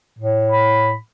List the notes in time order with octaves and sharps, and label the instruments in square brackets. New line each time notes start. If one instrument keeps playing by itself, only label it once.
[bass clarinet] A2
[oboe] B5